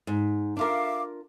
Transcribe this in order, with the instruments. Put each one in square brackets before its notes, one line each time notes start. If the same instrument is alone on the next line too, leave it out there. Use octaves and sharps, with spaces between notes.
[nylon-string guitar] G#2
[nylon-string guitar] D4 F4 A#4 [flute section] E5 F5 D6